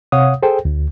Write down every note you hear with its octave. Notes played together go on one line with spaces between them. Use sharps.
C3 C#5 F5 F#5 D#6
G#4 A4 C5 G5
D2